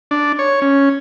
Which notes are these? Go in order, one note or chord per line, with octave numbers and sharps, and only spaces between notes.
D4
C#5
C#4